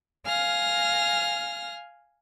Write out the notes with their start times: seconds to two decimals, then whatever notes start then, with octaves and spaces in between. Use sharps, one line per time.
0.25 F5 G#5 F6 A#6